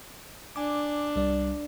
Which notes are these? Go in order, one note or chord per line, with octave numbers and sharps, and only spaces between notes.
D4 G#5 D6
C2 G3 D5